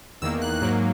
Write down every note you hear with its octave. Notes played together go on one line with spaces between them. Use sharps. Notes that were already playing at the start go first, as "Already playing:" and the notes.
E2 D#3 A#3 E6
F#6
G#2 F#3 A#3 F#6